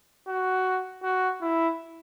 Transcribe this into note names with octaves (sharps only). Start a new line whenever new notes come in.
F#4
F#4
E4